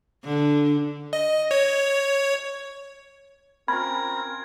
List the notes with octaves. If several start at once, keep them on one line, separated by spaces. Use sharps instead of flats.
D3
D#5
C#5
C4 C#4 F4 A#4 B5 G#6